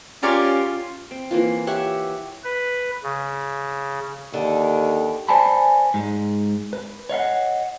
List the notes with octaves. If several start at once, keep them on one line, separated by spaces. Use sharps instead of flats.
C#4 F4 G4 A#4 D5
C4
E3 A#3 F4
G4 C#5 E5 F#5
B4
C#3
D#2 D3
B4 C5 D5 G#5 A5 B5
G#2 G#3
B4
C#5 D#5 F5 F#5